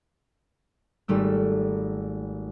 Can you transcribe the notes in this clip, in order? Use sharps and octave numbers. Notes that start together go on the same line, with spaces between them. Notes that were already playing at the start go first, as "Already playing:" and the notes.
G#1 G3 A3 E6